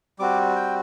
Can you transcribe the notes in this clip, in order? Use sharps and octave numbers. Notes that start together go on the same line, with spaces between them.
G3 C4 F#4 D6
G5